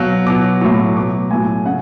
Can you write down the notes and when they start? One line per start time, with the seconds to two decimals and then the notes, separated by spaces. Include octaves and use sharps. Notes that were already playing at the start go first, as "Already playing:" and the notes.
Already playing: B2 F#3 F5
0.26 B2 F#3 D6
0.61 A2 F#3 C#6
0.96 B2 F#3 D6
1.31 A2 F#3 G#5
1.66 C#3 F#5